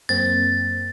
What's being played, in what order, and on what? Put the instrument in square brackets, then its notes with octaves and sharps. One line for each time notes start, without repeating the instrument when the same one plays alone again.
[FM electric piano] F#2 A#3 C4 [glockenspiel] A6